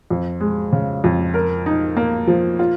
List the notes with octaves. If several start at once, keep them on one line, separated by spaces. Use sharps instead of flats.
F2
G#3
C#3
F2
A#4
D#4
A#3
F3
F4